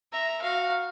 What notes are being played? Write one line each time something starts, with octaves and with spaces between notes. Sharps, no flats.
E5 A#5
F#4 F5